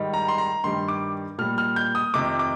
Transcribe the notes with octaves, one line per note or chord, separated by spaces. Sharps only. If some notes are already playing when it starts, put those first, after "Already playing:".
Already playing: G#2 D#3 G3
A#5
C6
A#5
G2 D#3 G3 C6
D6
A#2 G3 F6
F6
G6
D#6
F2 C3 D#3 D6
D6